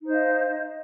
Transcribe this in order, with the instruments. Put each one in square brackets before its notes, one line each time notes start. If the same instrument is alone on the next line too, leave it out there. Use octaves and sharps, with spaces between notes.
[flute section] D#4
C5
D#5
F5